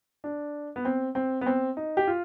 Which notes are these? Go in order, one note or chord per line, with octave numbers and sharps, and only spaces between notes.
D4
B3
C4
C4
B3
C4
D#4
G4
F4